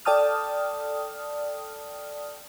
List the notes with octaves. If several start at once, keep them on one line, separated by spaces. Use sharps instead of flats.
A4 D5 G5 A5 D#6 F6